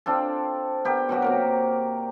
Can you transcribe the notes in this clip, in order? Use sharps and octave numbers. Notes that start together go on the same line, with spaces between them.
C4 D4 F4 A4
B3 G4 A#4
B2 F#3 F#4 G4
C3 A#3 A#4